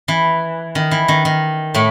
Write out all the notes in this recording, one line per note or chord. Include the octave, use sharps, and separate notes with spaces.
E3
D#3
E3
D#3
D#3
A2 A3